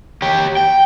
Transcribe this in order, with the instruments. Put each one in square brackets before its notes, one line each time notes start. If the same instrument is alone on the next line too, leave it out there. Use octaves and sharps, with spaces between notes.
[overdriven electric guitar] G4 C#5
G5